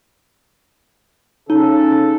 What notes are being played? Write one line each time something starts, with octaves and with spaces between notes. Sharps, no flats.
C#3 D#4 A4